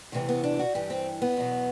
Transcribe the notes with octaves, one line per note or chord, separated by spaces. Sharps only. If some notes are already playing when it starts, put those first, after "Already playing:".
E2 C3 E3 A3
B3
D4
F#4
G2 E3 G4
C4
B3
E2 B2 F#3